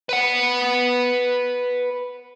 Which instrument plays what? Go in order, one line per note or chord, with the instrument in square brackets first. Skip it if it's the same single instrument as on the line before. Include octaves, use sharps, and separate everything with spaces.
[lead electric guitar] B4 F#5